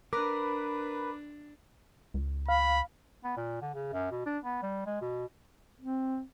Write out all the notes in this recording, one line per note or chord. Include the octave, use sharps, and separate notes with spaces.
D4 A#4 B4 D6
C#2
F5 B5
B3
A#2
D3
C#3
F#2
B2
D4
B3
G3
G#3
B2
C4